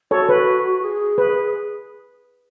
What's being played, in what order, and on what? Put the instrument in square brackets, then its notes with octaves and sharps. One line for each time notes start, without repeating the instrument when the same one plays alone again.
[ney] F#4 [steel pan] A4 C#5
[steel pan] B4
[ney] G#4
[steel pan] B4